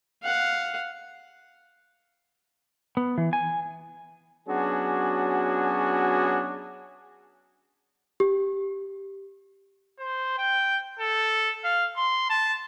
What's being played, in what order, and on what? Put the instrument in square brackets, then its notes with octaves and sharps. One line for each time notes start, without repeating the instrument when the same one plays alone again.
[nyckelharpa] F5 F#5
[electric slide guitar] B3
E3
G#5
[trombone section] F#3 B3 C#4 D4 F#4 G#4
[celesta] G4
[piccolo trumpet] C5
G5
A4
F5
C6
A5